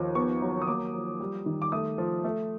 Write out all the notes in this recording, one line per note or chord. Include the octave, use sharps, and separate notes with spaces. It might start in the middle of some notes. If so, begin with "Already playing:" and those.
Already playing: D#2 F3
B3 C#6
F#3
D#6
A#3 D6
F3
G3
D#3
D6
A3 D#6
F3
A3